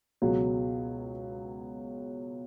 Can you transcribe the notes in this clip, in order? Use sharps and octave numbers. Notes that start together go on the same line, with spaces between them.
C#2 B2 F#3